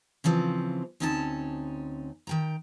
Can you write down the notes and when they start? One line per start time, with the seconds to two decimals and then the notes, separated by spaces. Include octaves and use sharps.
0.24 C#3 E3 F3 C4
1.00 D2 C4 C#4 D#4 E4 A5
2.27 D#3 G5 A#5